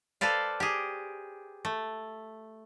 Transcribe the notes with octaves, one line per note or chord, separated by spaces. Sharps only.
A4 B4 C5 D5 F5
G4 G#4
A3